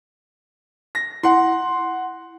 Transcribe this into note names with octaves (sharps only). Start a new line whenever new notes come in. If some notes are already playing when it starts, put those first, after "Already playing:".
A#6
E4 F#5 C6